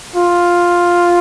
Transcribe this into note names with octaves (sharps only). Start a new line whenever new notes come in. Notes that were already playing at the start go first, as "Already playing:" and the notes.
F4